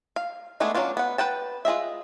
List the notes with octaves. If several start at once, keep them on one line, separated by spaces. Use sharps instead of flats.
F5
G#3 A3 B3 D4 G#4
F#3 A#3 C#4 D4 F4
B3 F#5
B4 F#5 G5 A5
F4 G#4 D#5 E5